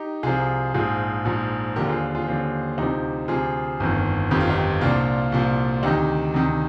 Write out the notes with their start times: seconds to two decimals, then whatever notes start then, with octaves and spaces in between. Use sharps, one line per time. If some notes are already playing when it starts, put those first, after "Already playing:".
Already playing: D#4 G4
0.23 C2 C3 F3 F4 G#4
0.74 A#1 G#2 F3 F4 G#4
1.25 A#1 G#2 F3
1.76 D#2 D3 F3 G4 A#4
1.89 F4 G#4
2.15 F4 G#4
2.27 D#2 D3 F3
2.78 D2 C3 F3 D#4 G4
3.28 D2 C3 F3 F4 G#4
3.80 G1 F2 D#3
4.31 G1 F2 D#3 G4
4.41 F4
4.49 D#4 G4
4.81 C2 A#2 F3 D4 F4
5.32 C2 A#2 F3
5.83 D2 C3 D#3 D#4 G4
6.34 D2 C3 D#3